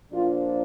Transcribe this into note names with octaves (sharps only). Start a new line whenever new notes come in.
A#2 F3 A#3 D4 F4